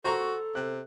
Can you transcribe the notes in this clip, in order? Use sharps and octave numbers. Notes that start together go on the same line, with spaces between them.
F#4 A4 C5 A#5 C#6
C3 F#6